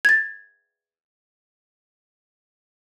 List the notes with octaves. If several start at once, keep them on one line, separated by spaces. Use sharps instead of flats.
G#6 A6